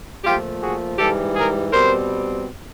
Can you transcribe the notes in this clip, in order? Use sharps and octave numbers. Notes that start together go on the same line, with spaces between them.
A#2 F3 A3 F4 G4
F#4 G#4
G#2 E3 G3 G4 A4
G#4 A#4
B2 G3 C4 A#4 C5